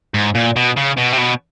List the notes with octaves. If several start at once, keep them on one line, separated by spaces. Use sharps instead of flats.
G#2
A#2
B2
C#3
B2
C3
B2